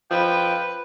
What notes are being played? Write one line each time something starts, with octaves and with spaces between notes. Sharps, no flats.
F3 B4 G5